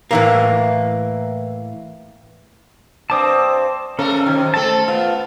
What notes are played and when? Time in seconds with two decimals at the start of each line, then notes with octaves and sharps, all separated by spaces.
0.11 A2 E3 A#3
3.10 G2 C4 A5 D6 D#6
3.99 G#3 C#4 A4 A#4
4.26 F#2 C3 D#3
4.54 A3 C4 A4 A5
4.88 B3 F4